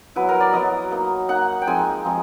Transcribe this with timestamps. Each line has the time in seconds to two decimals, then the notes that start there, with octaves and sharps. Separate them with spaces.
0.16 F#3 B3 E4 B4
0.29 A#4
0.40 D5
0.53 F#3 B3 E4 D#5
0.91 A#3 D#4
1.29 A#3 D#4 F#5
1.62 G5
1.67 F3 G#3 C4 D#4 G#5
2.05 F3 G#3 C4 D#4